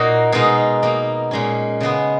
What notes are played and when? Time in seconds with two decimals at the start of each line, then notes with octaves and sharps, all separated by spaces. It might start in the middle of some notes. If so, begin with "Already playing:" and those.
Already playing: A#2 A#3 D#4 F#4
0.32 B2 G#3 D#4 A#4
0.83 B2 A#3 D#4
1.31 A#2 G#3 C#4
1.81 C#3 G#3 B3